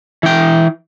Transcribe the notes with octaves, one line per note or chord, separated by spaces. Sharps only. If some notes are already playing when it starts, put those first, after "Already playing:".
E3 G5